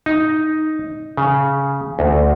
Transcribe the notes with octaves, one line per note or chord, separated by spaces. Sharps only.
D#4
C#3
D2